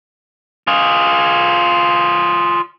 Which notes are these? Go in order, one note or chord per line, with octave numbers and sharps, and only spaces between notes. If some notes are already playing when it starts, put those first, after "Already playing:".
F4 G#4